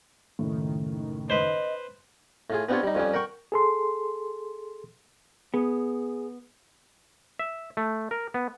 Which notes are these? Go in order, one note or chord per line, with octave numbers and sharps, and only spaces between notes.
F#1 A2 D#3
B4 C5 D#5
A2 F4 G#4
B3 C4 D4 F4 G4 C#5
G3 D#4
F2 F3 G3 C#4
A#4 F#5 G5 C#6
G#4 A4 C6
B3 G#4
E5
A3
A#4
B3